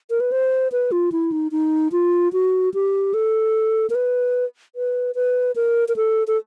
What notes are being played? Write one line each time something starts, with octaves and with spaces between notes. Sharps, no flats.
A#4
B4
C5
B4
F4
E4
D#4
D#4
F4
F#4
G4
A4
A#4
B4
B4
B4
A#4
A#4
A4
A4